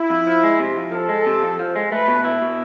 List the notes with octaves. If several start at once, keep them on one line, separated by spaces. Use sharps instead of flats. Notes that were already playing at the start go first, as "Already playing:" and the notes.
Already playing: E4
F2
F3
G#3
C3
F2
F3 A4
G#3
C3
F2
F3
G#3
A3 B4
B2
E4
B2